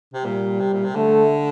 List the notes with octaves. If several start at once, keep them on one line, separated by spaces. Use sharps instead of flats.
C3
A#2 G3
C3
A#2
C3
D3 A3